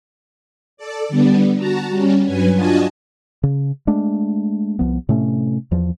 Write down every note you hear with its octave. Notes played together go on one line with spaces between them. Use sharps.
A4 D5
D3 G3 B3
F#4 A5 A#5
G3 C#4
G2 F#3 B4 G#5
D4 F4 F#4 D#5 G#5 A5
C#3
G#3 A3 D4
C2 F3 B3
A2 C3 A3 C#4
E2 F3